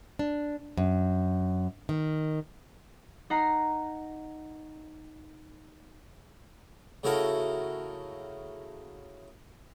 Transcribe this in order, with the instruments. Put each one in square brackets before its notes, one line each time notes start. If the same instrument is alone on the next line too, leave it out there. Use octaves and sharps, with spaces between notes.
[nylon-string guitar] D4
F#2
D#3
[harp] D#4 F#5 A#5 C7
[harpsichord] C#3 A3 E4 F#4 A4 A#4